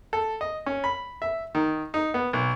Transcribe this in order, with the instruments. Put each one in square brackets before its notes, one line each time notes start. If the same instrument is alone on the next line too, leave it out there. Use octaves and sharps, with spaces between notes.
[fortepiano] A4
D#5
C#4
B5
E5
D#3
D#4
B3
B1